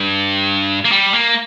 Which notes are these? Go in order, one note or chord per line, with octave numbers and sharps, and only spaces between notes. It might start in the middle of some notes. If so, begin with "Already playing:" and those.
Already playing: G2
A#3
G3
A#3